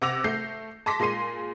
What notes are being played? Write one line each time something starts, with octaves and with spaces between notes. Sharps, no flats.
C3 F#5 D6 E6 A#6 F7
A3 G6 C7
A5 C6 D6 A#6 B6
A#2 G#3 C6 C7 D#7